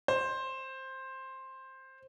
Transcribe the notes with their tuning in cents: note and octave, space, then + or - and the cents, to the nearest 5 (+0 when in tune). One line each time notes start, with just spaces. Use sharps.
C5 +10